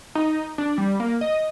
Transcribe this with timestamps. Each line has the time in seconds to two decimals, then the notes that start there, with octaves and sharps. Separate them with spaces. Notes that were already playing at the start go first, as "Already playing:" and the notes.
0.15 D#4
0.58 D4
0.78 G3
1.00 A#3
1.21 D#5